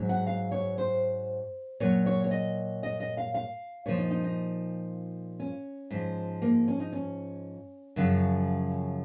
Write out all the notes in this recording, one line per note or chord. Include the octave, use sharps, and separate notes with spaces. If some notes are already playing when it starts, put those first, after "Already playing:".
Already playing: G#2 F#3
F#5
F5
C#5
C5
A#2 F#3 C#5
C#5
C#5
D#5
D#5
D#5
F5
F5
A#2 F3 C#5
D#4
D#4
D#4
C#4
G#2 F3
A#3
C#4
D#4
C#4
F#2 C#3 F3